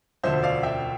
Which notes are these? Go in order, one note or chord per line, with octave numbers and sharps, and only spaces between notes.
E1 D2 D3 F3 C5 E5
D5 F5
E5 G5